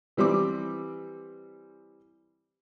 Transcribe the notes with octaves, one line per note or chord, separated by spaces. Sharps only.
E3 G3 C4 D6